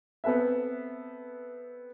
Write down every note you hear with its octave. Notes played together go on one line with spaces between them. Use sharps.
B3 C4 A4 B4 E5